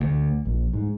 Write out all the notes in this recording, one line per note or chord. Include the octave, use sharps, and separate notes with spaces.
D2
A#1
G#2